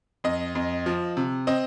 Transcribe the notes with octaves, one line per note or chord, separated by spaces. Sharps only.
F2 D#5
F2
F3
C3
C4 D#5